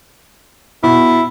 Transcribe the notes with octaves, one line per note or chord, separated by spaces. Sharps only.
B2 E4